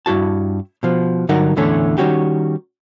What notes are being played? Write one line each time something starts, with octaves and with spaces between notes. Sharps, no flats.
G2 E4 F#4 A5
B2 F3
G2 D3 F#3 D#4 A#4 F#5
E2 A2 D3 E3 A3 C#4
D#3 G3 C#4 F#4 G4